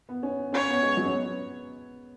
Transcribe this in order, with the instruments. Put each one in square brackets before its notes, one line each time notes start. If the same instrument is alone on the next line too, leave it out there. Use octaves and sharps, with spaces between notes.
[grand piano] B3
C#4
[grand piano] C#4 [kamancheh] C#5
[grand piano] B3
G#3
F#3
C#4
B3